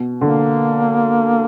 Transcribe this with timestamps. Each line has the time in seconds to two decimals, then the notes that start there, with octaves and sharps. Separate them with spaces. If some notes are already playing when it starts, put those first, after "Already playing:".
Already playing: B2
0.21 D3 A#3